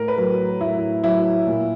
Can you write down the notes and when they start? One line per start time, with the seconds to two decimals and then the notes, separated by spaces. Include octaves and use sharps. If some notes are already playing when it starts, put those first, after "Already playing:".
Already playing: A2 A#4
0.08 B4
0.18 F#3 A#4
0.61 A2 E4
1.04 F#3 E4
1.47 A#2